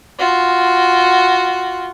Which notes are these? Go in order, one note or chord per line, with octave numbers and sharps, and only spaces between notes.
F4 F#4